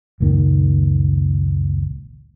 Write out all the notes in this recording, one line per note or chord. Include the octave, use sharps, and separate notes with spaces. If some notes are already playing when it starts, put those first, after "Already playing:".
F#1 C#2 A#2 D#3